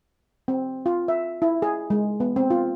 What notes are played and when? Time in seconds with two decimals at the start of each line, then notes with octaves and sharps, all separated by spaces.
0.48 C4
0.86 F4
1.08 E5
1.42 E4
1.62 G#4
1.90 G#3
2.20 B3
2.36 C4
2.50 F4